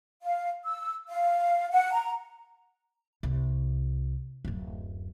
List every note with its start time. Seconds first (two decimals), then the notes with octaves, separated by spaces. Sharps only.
0.22 F5
0.64 E6
1.09 F5
1.71 F#5
1.92 A#5
3.23 C2
4.45 D1 F#2